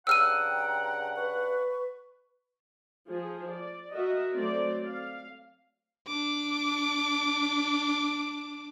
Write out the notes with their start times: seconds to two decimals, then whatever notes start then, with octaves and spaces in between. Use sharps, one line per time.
0.07 G2 C#3 F#5 G5 A#5 E6 F6 D#7
1.15 B4 C#6
3.09 F3 G#4
3.54 D5
3.93 F#4 A#4 D#5 E5
4.34 F#3 A3 C4 D5
4.87 F5
6.07 D4 D6